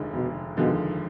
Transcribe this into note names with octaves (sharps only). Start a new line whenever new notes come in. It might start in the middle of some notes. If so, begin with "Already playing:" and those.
Already playing: F1 D#2 D3 F3 G#3
F1 B2
D#2 B2 D3 F3 G#3